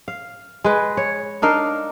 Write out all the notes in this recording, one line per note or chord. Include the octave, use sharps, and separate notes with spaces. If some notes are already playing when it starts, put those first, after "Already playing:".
F5
G#3 B4
C#5
D4 D#4 A#4 F5